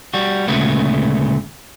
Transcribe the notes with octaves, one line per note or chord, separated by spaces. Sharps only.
G3 F#4
D2 A#2 C#3 G#3 A3 B3